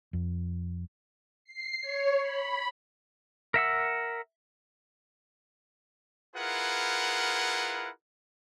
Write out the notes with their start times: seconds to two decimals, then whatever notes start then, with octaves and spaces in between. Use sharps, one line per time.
0.13 F2
1.45 C7
1.81 C#5
2.21 B5
3.54 A#4 E5 F#5 E6
6.35 E4 F4 G#4 A#4 B4 F#5